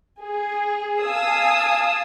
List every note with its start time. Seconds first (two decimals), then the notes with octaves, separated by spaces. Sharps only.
0.20 G#4
1.03 F5 G#5 A5 D#6 E6